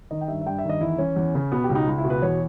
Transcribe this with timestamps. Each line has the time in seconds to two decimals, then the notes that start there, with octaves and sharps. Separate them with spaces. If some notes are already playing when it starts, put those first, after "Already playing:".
0.11 D#3 D#5
0.21 G5
0.28 G2 E5
0.41 E5
0.46 G2 G5
0.58 E5
0.64 D#3
0.69 D#5
0.81 E2 E4
0.98 E3 C#4
1.16 E2
1.35 C#3
1.52 B2 B3
1.64 G4
1.69 C#2
1.75 D#4
1.87 C#2
1.98 E4
2.04 B2
2.10 B4
2.22 E2 C#5